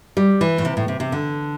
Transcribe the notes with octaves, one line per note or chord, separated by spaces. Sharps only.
G3
E3
A2
C3
A2
C3
C3
D3